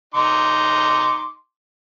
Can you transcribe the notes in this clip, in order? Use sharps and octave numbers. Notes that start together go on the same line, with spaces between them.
D#4 C6 D6